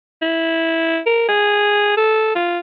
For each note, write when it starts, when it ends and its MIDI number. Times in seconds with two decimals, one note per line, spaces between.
0.22 0.99 64
1.06 1.27 70
1.29 1.94 68
1.97 2.32 69
2.35 2.59 65